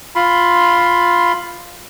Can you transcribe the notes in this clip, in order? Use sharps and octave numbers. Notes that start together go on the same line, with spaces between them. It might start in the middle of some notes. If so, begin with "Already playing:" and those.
F4 B5 C6